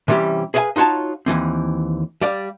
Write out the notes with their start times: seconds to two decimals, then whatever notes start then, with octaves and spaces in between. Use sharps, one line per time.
0.08 C3 E3 G3 C#4 G4
0.54 G#4 B4 C#5 E5 F5 G#5
0.76 D#4 F4 F#4 C#5 A5
1.26 D#2 C#3 E3 C4
2.21 G3 D5 F5